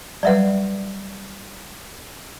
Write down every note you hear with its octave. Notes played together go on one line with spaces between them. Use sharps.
F#3 G3 B4 D5 E5 F#5